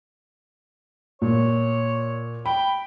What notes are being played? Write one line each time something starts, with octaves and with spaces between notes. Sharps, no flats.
A#2 C#5
G5 B5